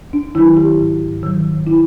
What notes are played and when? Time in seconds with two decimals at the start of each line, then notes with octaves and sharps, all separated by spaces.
0.13 D4
0.35 D#3 F#3 E4
0.57 G4
0.80 G#2
1.23 D#3 F#3
1.67 E4